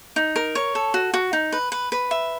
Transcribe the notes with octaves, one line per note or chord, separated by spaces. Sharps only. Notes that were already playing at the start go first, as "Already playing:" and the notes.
D#4
A#4
C#5
A4
F#4
F#4
D#4
B4
B4
B4
E5